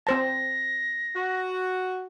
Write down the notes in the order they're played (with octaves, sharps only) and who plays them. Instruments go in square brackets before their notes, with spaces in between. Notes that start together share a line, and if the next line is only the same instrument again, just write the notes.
[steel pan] C4 C5 A5 [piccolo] A#6
[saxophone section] F#4